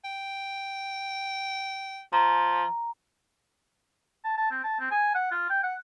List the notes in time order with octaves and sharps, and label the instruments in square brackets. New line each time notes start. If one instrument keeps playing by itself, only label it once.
[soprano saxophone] G5
[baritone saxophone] F3 [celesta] A#5
[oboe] A5
A5
C4
A5
C4
G#5
F#5
F4
G5
F#5